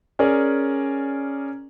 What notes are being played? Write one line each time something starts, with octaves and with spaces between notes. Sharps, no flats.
C#4 G#4 A#4 D5